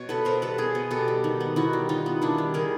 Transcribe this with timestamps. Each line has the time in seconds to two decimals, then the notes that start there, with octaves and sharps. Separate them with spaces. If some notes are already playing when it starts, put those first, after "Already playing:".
Already playing: B2 C#5
0.09 B3 A4 B4
0.25 B2 A#4 C5
0.42 G3 A4 B4
0.58 B2 G#4 A#4
0.75 B3
0.91 B2 G4 A4
1.08 G3
1.24 D#3
1.40 B3
1.56 D#3 E4 F#4
1.73 G3
1.89 D#3 D#4 F4
2.06 B3
2.22 D#3 D4 E4
2.38 G3
2.54 D#3 G#4 A#4